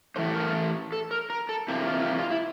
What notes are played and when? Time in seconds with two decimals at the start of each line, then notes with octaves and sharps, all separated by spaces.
0.16 A2 E3 A3 C5
0.34 A#4
0.92 A4
1.11 A#4
1.30 A#4
1.49 A4
1.68 C3 E3 A#3 G4
1.87 F4
2.02 F4
2.06 G4
2.19 F4
2.31 E4